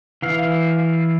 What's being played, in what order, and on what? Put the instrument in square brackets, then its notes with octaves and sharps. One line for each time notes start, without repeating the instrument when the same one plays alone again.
[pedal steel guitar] E3 F5